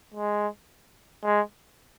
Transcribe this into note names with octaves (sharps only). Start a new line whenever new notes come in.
G#3
G#3